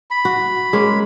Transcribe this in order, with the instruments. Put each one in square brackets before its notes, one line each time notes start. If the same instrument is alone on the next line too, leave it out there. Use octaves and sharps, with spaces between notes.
[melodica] B5
[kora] F#4
G#3 A#3 C#4